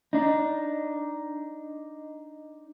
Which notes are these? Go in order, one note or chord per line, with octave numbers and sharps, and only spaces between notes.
D4 D#4